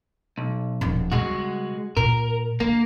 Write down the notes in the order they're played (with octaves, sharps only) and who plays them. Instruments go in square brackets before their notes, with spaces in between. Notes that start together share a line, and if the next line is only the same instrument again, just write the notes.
[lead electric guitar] B1
[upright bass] D#1 A#1
[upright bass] C#3 G3 [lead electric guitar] G#3 F#4
[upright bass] A#2 [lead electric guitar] A#4
[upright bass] D3 [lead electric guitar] A#3